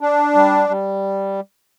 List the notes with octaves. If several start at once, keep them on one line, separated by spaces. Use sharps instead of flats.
D4
G3
G3